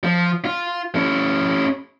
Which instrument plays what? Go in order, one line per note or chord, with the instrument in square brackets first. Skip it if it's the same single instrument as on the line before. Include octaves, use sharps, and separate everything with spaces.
[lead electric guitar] F3
F4
C#4 E4